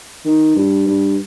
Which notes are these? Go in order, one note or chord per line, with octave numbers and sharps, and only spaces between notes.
D#3
G2
G2